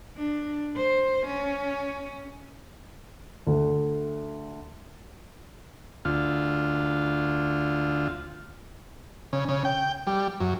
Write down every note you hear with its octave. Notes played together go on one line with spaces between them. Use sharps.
D4
C5
C#4
D2
D2 F4
C#3
C#3
G5
G3
F#2